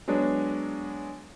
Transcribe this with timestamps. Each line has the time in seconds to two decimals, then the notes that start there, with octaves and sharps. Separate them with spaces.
0.08 F#3 G#3 B3 D4 C#5